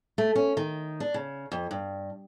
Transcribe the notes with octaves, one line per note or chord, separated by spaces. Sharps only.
A3
C#4
D#3
D4
C#3
F2
G2